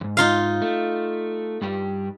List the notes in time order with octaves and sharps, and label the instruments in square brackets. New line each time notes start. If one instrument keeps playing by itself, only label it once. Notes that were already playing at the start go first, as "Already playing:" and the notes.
[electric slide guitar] F2 G#2
[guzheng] D#4 F4 F5
[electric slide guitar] A3
G2 G3 G4